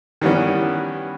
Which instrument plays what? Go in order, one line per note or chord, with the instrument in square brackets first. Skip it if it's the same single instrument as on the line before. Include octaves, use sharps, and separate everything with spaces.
[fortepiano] D#3 E3 G3 B3 C#4